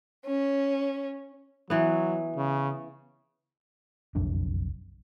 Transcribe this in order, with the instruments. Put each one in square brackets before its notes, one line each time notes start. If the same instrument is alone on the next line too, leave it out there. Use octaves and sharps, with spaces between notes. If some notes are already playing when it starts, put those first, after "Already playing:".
[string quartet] C#4
[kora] E3 B3 [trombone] F#3
[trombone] C#3
[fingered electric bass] F#1 B1 F2 D4